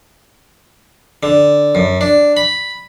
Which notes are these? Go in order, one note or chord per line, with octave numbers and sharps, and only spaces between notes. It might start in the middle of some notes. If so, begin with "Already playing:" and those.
D3
F#2
D4
B5